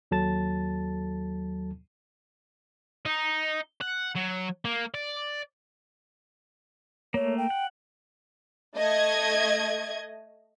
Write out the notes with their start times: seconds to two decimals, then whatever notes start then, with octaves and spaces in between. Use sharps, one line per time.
0.11 D#2 F#3 A4 A5 A6
3.05 D#4
3.81 F#5
4.16 F#3
4.65 A#3
4.94 D5
7.14 A3 A#3 C#5
7.38 G5
7.50 F#5
8.76 A3 D#5 G#6